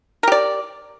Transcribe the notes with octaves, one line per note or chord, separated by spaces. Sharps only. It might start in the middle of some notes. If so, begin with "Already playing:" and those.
G4 A#4 D5